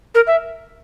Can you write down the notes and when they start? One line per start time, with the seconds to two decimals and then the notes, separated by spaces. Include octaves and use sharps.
0.15 A#4
0.27 E5